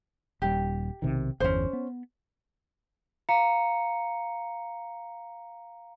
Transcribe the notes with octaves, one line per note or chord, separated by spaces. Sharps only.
D#1 G3 G4
B1 C3 D#3
G1 E2 C#4 C5
B3
F5 A#5 C#7